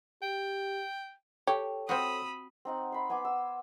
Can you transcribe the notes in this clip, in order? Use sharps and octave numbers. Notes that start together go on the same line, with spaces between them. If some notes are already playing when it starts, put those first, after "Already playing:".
G4 G5
G4 A4 C#5
C4 F4 F#4 B5 D#6 E6
C4 D#4 F#5
B5 C6
B3 G#5 C6 D6
E6